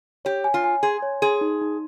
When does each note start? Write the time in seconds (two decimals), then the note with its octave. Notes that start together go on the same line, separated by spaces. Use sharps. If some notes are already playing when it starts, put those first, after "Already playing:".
0.25 G4 C#5
0.44 G#5
0.54 F4
0.64 G#5
0.83 G#4 C6
1.02 C#5
1.22 G#4 C6
1.41 D#4
1.61 D#4